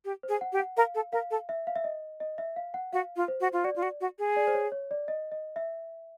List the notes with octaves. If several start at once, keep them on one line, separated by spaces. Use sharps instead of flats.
G4
C5
G#4
F#5
G4
F#5
A#4 F5
A4
A#4 F5
A4
E5
F5
E5
D#5
D#5
E5
F5
F#5
F#4 F5
F4
C5
F#4
F4
F#4 D5
F4
F#4
F#4
G#4
D5
C5
C#5
C#5
D5
D#5
D#5
E5